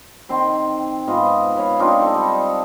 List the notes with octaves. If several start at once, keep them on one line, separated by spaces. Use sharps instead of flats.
D#3 C4 C6
G#2 B3 F4 D#5
B4 C#5 F5
C4 D4 D#4 F4
D#4 A4
G3